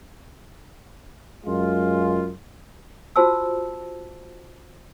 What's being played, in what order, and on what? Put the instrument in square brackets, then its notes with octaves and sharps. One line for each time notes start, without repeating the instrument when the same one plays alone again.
[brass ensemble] F#2 G#3 F4
[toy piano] F4 F#4 C5 A5 E6